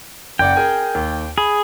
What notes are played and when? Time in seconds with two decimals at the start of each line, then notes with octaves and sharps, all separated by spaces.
0.39 F#1 D5 F#5 G5
0.56 G#4 A#4 G#5
0.95 D#2
1.38 G#4 B5